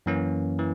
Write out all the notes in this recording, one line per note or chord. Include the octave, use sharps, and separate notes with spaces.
F#2 E3 A#3 C#4
E3